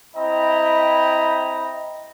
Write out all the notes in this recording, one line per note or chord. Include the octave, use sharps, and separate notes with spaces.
C4 E4 D#5 G5 A#5 B5